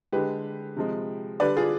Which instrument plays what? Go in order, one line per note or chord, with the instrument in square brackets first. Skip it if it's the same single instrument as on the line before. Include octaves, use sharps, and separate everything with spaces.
[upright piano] D3 G#3 G4 B4
C3 F3 G#3
D3 G3 B4 D5
F4 G#4